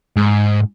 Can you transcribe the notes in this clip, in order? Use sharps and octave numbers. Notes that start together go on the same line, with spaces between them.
G#2